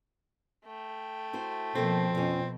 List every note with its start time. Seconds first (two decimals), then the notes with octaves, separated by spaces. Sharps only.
0.65 A3 G5
1.33 E4 F#4 C5
1.75 B2 F3 A#3 C4 A4
2.15 F2 B2 C#4